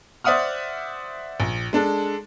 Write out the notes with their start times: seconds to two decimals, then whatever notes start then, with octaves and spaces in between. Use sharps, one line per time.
0.24 C5 D5 E5 F#5 D#6 F6
1.40 A#1
1.73 G#3 D4 A4